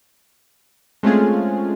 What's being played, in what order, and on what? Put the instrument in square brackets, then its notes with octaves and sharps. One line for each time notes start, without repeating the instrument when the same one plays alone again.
[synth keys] G#3 A3 C4 C#4 F4 G#4